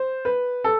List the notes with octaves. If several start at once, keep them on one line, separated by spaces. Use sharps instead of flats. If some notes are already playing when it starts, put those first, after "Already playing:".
Already playing: C5
B4
A4